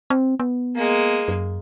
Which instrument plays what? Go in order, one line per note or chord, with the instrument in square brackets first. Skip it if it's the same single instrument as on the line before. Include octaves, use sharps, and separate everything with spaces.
[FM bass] C4
B3
[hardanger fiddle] G#3 A#3
[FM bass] F#2